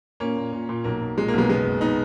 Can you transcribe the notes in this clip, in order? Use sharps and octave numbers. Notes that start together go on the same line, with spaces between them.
A#2 A#3 C#4
A#2
A#2
A#2
B1 A#3
B1
A#2 G#3
A#3
B1 G#3 B3
F#1 G#3 B3
F#1
B3 D#4